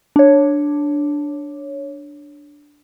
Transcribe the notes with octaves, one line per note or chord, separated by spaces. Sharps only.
D4 C#5